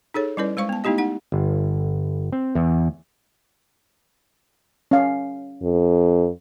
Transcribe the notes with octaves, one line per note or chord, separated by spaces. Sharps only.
D#4 G#4 A4 C#5
G3 C#4 E4 B4 D5
G#3 C5 F5 C#6
B3 A5
A3 B3 D#4 E4 G4 D#5
D#4 F#5
G1
C4
E2
C#4 F5
F2